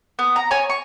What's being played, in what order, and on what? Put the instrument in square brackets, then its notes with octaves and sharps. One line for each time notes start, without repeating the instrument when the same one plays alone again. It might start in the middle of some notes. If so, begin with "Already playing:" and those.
[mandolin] B3
A#5
C#5 G#5
C#6